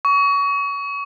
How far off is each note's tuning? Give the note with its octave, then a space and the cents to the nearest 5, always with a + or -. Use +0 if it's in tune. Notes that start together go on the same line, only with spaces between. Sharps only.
C#6 +30